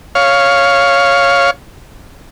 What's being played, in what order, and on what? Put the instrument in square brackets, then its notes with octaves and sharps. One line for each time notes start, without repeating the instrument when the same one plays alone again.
[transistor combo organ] C#5 F5